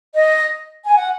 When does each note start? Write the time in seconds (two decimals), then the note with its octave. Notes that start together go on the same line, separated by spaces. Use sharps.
0.14 D#5
0.85 G#5
0.96 F#5